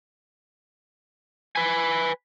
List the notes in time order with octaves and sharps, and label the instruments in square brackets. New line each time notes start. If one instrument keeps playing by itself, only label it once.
[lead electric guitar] B4 G#5